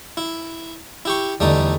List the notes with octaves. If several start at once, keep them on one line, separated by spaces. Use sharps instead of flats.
E4
E4 G4 C#6
E2 D3 G3 A3 D#4